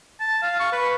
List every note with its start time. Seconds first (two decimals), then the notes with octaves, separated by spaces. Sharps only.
0.20 A5
0.42 F5
0.60 C#6
0.72 B4